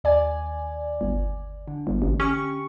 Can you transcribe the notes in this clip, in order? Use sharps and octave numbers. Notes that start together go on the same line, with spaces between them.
D#2 D5 G#5
G1
D3
G1
A1
C#4 G4 C#6